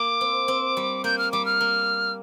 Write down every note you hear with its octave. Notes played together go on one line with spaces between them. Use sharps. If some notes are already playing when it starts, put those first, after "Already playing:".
Already playing: A#3 D6
C4
C4
G3
A#3 G6
F6
G3 D6
F6
A#3